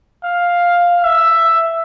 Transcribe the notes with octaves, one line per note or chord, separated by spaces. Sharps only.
F5
E5